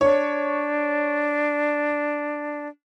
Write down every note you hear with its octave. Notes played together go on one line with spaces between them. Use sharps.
D4 C#5